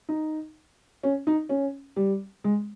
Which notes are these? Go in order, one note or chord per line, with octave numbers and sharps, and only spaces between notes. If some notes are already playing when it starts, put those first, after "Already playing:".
D#4
C#4
D#4
C#4
G3
G#3